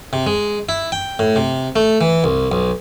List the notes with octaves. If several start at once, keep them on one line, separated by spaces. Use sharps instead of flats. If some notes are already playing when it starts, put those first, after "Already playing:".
C3
G#3
E4
G5
A2
C3
A3
E3
C2
B1